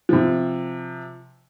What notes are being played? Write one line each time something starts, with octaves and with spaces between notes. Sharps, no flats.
C3 F3